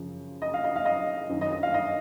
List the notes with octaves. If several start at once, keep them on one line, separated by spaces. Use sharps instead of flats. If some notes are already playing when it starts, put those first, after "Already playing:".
Already playing: F#2 C#3 F3
D#5
F5
D#5
F5
D#5
F#2 D#3
D#5
D#5
F5
D#5